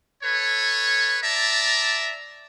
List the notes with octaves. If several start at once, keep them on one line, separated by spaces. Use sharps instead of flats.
A4 B4 C#5
D5 E5 A5 A#5